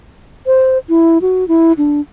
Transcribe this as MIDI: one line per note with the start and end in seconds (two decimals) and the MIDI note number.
0.47 0.78 72
0.89 1.18 64
1.22 1.47 66
1.48 1.73 64
1.78 2.01 62